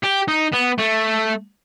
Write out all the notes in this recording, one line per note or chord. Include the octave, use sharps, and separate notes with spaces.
G4
D#4
B3
A3